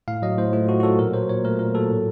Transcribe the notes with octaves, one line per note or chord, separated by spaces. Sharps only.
A2 F5
F#3 D#5
A2 C5
A3 F4
A2 F#4
F#4
F#3 A4
A#2 A#4
F#3 C5
A#2 C#5
A3 A#4
A#2 A#4
F#3 A4
A2